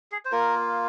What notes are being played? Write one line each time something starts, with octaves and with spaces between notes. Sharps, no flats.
G#4
C5
A#3 F4 A#4